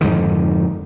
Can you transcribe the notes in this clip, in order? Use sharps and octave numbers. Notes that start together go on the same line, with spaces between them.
F2 G#2 D3 D#3